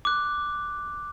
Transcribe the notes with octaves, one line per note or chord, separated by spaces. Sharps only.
D6 F#6